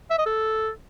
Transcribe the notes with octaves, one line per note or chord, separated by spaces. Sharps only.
E5
D#5
A4